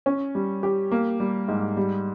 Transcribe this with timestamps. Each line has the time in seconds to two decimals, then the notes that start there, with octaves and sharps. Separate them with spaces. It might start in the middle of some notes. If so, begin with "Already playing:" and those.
0.06 C#4
0.35 G3
0.63 G4
0.92 A#3
1.20 G3
1.48 G#2
1.77 G3